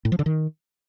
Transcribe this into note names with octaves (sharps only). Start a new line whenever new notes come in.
A2
F3
D3
D#3